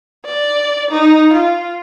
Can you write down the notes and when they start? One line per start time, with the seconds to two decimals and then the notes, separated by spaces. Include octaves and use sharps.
0.25 D5
0.90 D#4
1.33 F4